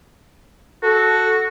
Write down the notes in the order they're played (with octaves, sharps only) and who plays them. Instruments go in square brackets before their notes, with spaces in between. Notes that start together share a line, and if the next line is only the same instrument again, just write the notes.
[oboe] F#4 [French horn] A4